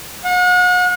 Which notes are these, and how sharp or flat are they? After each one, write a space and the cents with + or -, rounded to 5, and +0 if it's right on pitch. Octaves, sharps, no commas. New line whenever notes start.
F#5 -40